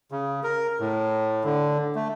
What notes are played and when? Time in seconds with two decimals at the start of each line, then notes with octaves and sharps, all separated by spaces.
0.11 C#3
0.43 A#4
0.80 A2
1.44 D3
1.95 A3